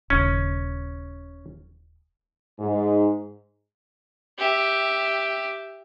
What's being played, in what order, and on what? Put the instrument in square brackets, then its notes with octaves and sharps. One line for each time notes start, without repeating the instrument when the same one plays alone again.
[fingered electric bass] D#1 C#3 [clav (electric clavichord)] C#4
[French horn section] G#2
[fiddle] G4 E5